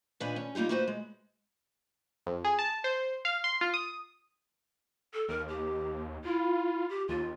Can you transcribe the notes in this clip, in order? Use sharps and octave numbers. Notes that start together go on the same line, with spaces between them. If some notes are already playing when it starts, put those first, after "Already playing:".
A#2 D#3 D4 B4 F5 G#5
C#4
G3 A#3 D#4 F4 G4
A#3 D#4 F#4 G4 B4 C5
G#3
F2
G#4
A5
C5
F5
C6
F4
D#6
A4
D#2 A#4
G4
E4 F4
G4
D#2 F4